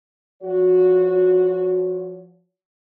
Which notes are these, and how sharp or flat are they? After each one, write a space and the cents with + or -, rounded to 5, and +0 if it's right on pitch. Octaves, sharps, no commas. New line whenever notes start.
F3 +0 F#4 -15 C#5 +30